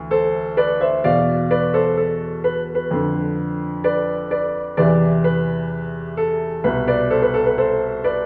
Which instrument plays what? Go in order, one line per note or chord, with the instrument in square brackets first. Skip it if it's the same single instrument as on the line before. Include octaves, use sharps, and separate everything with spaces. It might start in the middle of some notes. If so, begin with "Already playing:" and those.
Already playing: [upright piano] D2 E3
A4 C5
B4 D5
C5 E5
E2 B2 D5 F5
B4 D5
A4 C5
A4
B4
B4
F2 D3
B4 D5
B4 D5
E2 C3 E3 B4 D5
B4
A4
C2 B2 B4
B4 D5
A4 C5
B4
A4
B4
A4 C5
B4 D5